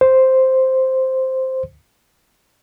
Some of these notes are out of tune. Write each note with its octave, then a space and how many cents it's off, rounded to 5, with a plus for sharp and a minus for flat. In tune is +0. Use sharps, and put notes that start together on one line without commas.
C5 +0